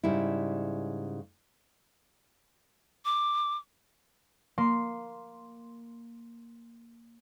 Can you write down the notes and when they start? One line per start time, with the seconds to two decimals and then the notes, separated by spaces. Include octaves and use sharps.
0.03 G#2 C#3 G3 E4
3.05 D6
4.58 A#3 C6